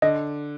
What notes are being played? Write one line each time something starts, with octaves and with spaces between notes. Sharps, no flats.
D3 D#5